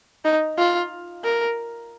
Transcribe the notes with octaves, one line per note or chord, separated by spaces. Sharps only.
D#4
F4
A#4